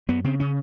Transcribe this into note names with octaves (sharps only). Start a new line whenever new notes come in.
F#2 B3
C#3 C4
C#3 C#4